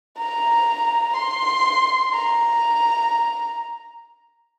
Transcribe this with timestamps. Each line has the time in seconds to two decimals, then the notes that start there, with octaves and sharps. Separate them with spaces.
0.18 A#5
1.16 C6
2.13 A#5